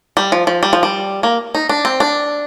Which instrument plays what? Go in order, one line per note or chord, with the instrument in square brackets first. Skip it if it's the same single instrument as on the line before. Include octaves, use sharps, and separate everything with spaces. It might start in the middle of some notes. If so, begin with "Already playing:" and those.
[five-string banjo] G3
F3
F3
G3
F3
G3
A#3
D#4
D4
C4
D4